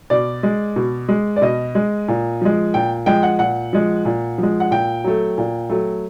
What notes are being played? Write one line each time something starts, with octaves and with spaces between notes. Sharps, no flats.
B2 D5
G#3
B2
G#3
D5
B2 D#5
G#3
A#2
F3 G#3
A#2 G5
F3 G#3 G5
F#5
A#2 F#5
F3 G#3
A#2
F3 G#3
F#5
A#2 G5
F#3 A3
A#2
F#3 A3